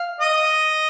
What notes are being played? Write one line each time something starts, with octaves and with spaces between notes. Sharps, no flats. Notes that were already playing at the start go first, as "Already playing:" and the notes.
Already playing: F5
D#5